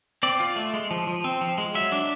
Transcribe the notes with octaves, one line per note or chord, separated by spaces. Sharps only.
C4 D5
F4
A3
G#3
F3
F3
C4
F3
G#3
F#3 E5
D4